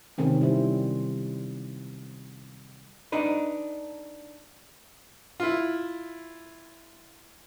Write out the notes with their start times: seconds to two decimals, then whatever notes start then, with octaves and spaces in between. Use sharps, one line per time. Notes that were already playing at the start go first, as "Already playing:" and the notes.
0.18 C3 D#3 G#3 C4 C#4
0.41 G3 E4 C5
3.12 D4 D#4 B4
5.40 E4 F4